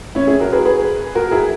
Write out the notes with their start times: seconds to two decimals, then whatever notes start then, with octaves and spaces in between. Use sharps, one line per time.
0.15 C#4 E4
0.27 E4 G#4
0.40 F#4 A#4
0.52 G#4 B4
0.65 G#4 B4
1.15 F#4 A#4
1.31 E4 G#4